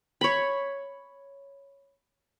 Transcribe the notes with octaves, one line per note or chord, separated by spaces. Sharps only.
C#5 B5